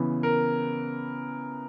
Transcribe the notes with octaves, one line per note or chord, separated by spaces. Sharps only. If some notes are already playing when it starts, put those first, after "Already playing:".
Already playing: C#3 E3 B3
A#4